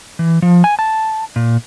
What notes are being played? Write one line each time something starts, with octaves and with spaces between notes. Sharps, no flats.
E3
F3
G#5
A5
A#2